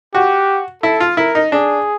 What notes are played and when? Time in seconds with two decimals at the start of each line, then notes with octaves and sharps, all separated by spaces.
0.14 F#4 G4
0.83 E4 A4
1.00 F4
1.17 E4 A#4
1.35 D#4
1.52 D4 G#4